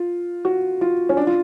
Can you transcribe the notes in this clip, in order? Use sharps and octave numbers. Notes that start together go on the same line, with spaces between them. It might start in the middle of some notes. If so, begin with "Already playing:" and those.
Already playing: F4
F#4
F4
C#4
D4
F4